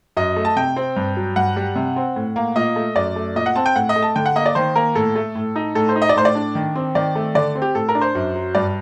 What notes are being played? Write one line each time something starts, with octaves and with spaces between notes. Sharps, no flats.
F#2 D#5
A3
A5
C3 G5
C4
G2
F#3
G2 F#5
G3
C3
C4
A2
A#3
A#2 D#5
A3
F#2 D5
A3
A#2 D#5
F#5
C4 A5
G5
A2 F#5
D#5
A3
A5
D3 G5
F#5
A#3 D#5
D5
D#3 C5
A#3 A#4
A2 A4
A3
A2
D#4
A2 A4
C5
D#4
D#5
D5
A2 C5
D5
D4
D#3
C4
D#3 D5
A3
D3 D5
C4
G4
A2 A4
A#4
D4
C5
F#2
F#3
G2 D5